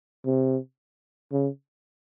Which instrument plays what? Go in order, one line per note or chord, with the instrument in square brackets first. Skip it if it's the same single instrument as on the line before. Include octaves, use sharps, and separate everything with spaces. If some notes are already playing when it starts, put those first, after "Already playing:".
[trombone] C3
C#3